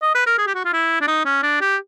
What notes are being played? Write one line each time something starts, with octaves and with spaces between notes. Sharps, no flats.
D#5
B4
A#4
G#4
G4
F#4
F4
E4
D4
D#4
C#4
D4
G4